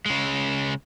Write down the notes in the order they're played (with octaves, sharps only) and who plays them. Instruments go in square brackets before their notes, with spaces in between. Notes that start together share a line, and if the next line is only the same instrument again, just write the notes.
[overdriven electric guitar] C#3 G#3